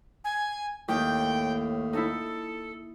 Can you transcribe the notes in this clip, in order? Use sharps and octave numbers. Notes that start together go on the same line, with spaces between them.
G#5
D#2 A2 G5
D#4 E4 A4